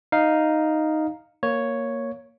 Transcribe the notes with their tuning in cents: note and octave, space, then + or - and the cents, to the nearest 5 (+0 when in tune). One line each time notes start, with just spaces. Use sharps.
D#4 +0 F5 +0
A#3 +0 C#5 +0